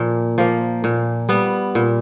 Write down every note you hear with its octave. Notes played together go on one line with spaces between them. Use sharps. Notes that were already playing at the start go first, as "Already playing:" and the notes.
Already playing: A#2 F3 A#3
F3 A#3
A#2
G3 B3
A#2